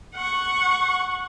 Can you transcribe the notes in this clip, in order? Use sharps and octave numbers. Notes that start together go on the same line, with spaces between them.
F#5 C#6